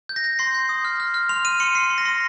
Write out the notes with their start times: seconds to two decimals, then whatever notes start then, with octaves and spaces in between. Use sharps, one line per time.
0.09 G6
0.16 A#6
0.24 G6
0.39 C6 C7
0.54 G6
0.69 D#6
0.85 F6
1.00 F6
1.14 F6
1.29 C6 F7
1.45 F6 D#7
1.60 C6 C#7
1.75 C6 C7
1.90 C6
1.98 A#6
2.05 C6